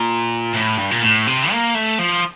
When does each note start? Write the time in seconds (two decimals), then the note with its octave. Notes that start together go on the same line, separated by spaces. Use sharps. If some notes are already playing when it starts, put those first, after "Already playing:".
Already playing: A#2
0.54 A2
0.78 G2
0.91 A#2
1.02 A2
1.27 C3
1.51 A#3
1.75 A3
1.99 F3